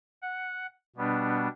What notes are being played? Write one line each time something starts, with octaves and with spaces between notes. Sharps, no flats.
F#5
B2 G3 B3 D4